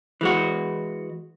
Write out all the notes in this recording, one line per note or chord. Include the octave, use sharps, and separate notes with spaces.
E3 G#3 F#4